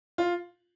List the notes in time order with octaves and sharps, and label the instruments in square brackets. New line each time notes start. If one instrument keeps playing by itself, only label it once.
[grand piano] F4